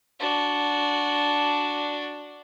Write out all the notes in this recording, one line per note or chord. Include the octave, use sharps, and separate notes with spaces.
D4 F#4